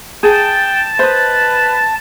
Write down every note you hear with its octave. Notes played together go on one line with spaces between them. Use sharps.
G#4 G5 A5
B4 C5 D#5